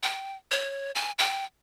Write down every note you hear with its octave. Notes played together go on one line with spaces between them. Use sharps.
G5
C#5
G#5
G5